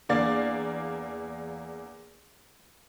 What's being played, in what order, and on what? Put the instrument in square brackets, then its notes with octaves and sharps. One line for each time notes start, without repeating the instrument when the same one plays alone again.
[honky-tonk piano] E2 A#3 D4 D5 F5 A6